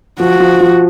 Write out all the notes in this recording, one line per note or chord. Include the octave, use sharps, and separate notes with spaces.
F3 F#4
F3
F3